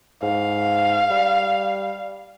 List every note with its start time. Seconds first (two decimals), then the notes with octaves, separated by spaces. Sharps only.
0.23 G#2 F5
1.11 G3